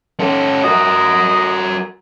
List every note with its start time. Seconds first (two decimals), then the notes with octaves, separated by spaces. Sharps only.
0.20 C#4 A4
0.64 F#4 A#4 D#5